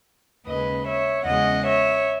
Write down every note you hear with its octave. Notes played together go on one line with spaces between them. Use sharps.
D#2 C#3 G#3 B4 D#5
C#5 E5
E2 C#3 G#3 D#5 F#5
C#5 E5